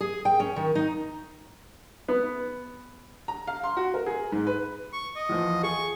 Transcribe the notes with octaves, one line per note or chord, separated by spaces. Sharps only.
G#4
G5
C#4
D#3
D#4
B3
A#5
F5
C6
F#4
A#4
G#4
G#2
B4
C#6
D#5
E2 F3
G#4 C#6